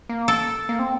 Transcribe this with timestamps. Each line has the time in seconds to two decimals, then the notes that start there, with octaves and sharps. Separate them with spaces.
0.09 A#3
0.28 A4
0.69 A#3
0.79 C4